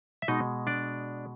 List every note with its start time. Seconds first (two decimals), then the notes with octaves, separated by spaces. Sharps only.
0.22 E5
0.28 B2 G#3 D#4 D#5
0.67 D4 D5